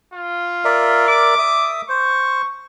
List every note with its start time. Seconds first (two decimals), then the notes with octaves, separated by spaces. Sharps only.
0.14 F4
0.65 A#4 D5 E5
1.08 D6
1.39 E5 D#6
1.89 C5 C#6